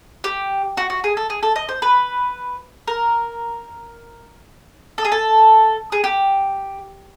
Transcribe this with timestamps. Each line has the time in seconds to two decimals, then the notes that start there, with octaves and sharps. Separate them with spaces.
0.24 G4
0.77 F#4
0.90 F#4
1.04 G#4
1.17 A4
1.30 G#4
1.43 A4
1.56 D#5
1.69 C5
1.82 B4
2.88 A#4
4.98 A4
5.05 G#4
5.12 A4
5.92 G#4
6.04 G4